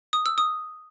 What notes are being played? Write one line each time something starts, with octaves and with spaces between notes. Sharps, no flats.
D#6
E6
D#6